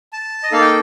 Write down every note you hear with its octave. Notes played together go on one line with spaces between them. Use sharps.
A5
D#5
A#3 D#4 A4 F5
G5